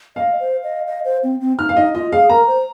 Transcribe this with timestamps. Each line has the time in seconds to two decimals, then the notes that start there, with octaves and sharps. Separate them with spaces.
0.16 D#5 F5
0.40 C5
0.64 D#5
0.87 D#5
1.05 C5
1.23 C4
1.41 C4
1.59 D#4 F6
1.69 F5
1.76 D#4 D#5
1.94 F4 D#5
2.12 G#4 F5
2.29 A#4 A#5
2.47 C5